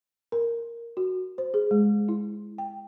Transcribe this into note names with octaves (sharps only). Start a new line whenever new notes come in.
A#4
F#4
C5
G#4
G#3
E4
G5